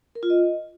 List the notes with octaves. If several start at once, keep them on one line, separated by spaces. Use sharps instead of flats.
A#4
F4
D#5